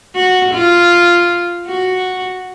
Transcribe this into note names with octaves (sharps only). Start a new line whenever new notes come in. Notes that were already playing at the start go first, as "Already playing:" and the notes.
F#4
F4
F#4